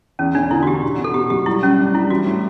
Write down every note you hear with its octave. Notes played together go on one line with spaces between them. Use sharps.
E2 C#4
E1 D4
D3 E4
F#4
E2 G4
B2
B2
A4
B2 G4
F#1 G4
G3 E4
G3 C#4
D4
G3 E4
E3 F#4
A2